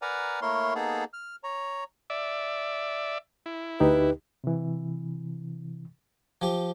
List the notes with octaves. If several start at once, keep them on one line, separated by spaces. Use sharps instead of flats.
A#4 B4 D5 F#5 G#5 A#5
A3 A#3 E4 A#4 C#5 C6
A#3 B3 D#4 G#4 A4
F6
C#5 A#5
D5 E5
E4
D2 D#4 G4 B4
C3 E3
F3 G4